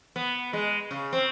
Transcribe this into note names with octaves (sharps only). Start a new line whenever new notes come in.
B3
G#3
C#3
C4